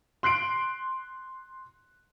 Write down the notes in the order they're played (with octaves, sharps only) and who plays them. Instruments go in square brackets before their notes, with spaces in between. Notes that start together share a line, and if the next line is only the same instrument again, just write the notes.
[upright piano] C6 F#6 C7 D7